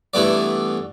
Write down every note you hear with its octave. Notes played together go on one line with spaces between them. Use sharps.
G2 E3 A3 B3 D5